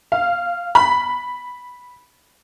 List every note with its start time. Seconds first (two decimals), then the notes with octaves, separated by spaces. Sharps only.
0.12 F5
0.75 B5